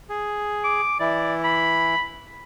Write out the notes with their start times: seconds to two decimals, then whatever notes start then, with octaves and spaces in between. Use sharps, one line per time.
0.09 G#4
0.64 D6
1.00 E3 E4 D5
1.44 B5